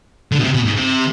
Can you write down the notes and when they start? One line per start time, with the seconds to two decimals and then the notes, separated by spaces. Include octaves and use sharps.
0.32 D3
0.39 B2
0.44 C3
0.54 B2
0.65 G#2
0.76 C3